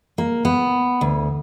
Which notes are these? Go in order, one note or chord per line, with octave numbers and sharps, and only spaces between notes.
A#3
B3
D2